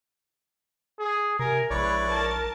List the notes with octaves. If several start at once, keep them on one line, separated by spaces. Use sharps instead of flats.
G#4
C3 A#4 G#5
A#1 G#3 E4 B4 C#5 D5
A#4 A5